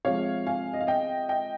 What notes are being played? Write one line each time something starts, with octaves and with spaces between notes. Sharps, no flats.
C3 F3 G#3 C#5 F5
F5 G#5
D#5
F5
D#5 G5
D#5 G5